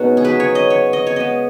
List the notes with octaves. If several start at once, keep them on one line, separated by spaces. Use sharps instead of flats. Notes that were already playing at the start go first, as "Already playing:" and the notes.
Already playing: B2 G#3 B3 C#4 D#4 F#4
G#4
C#3 F#3 B3 B4
C#5
D#5
C#5
D#5
C#5
C#3 G#3 B3 D#5